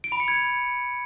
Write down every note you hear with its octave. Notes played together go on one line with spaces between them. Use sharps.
D7
B5
C#7
G#6